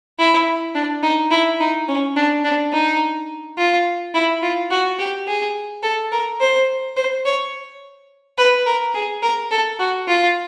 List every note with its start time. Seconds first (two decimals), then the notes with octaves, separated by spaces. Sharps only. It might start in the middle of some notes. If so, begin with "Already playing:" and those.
0.19 E4
0.75 D4
1.03 D#4
1.31 E4
1.60 D#4
1.88 C#4
2.16 D4
2.44 D4
2.73 D#4
3.58 F4
4.14 E4
4.42 F4
4.71 F#4
4.99 G4
5.27 G#4
5.83 A4
6.12 A#4
6.41 C5
6.97 C5
7.26 C#5
8.38 B4
8.66 A#4
8.95 G#4
9.23 A#4
9.51 A4
9.79 F#4
10.08 F4